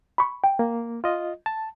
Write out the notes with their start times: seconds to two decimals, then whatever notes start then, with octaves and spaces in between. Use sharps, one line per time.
0.18 B5 C#6
0.44 G5
0.59 A#3
1.04 F4 D#5
1.46 A5